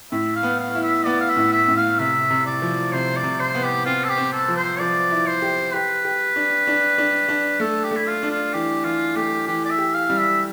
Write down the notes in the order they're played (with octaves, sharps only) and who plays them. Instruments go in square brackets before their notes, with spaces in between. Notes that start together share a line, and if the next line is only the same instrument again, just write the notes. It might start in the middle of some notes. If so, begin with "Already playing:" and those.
[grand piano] A2 [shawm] E5
[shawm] F5
[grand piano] B3
[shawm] F5
[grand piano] E4
[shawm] E5
[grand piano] B3 [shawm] D5
[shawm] F5
E5
[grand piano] A2
[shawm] E5
[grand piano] A2
[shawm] F5
[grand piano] C3 [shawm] E5
[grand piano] C3
[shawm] D5
[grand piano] F3
[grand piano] C3 [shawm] C5
[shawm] D5
[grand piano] C3
[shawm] C5
[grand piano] B3
[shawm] G4
[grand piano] C4 [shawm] F4
[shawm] A4
G4
[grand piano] C4
[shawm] A4
[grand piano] F3
[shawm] C5
[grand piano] F3 [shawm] D5
[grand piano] E4
[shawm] C5
[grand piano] G4
[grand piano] G4 [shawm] B4
[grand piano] G4
D4
D4
D4
D4
[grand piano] A3 [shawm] A4
[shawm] G4
[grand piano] A3
[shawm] E4
F4
[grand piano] D4
[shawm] F4
[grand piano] E3 [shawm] G4
[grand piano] E3 [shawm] F4
[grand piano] A3 [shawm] G4
[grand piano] E3 [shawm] G4
[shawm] D5
E5
[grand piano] G4
[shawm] F5
[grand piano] G3
[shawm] E5